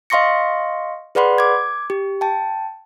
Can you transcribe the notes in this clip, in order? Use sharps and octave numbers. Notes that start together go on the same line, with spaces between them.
D#5 F5 C6 C#6 A#6 C#7
G#4 B4 D5 F#5 B5 C6
D6 G#6
G4
G5 A5